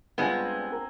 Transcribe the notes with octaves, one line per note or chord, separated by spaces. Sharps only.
G2 G#3 B3 C4 D4 F4 F#5 G#5
A#4 A#5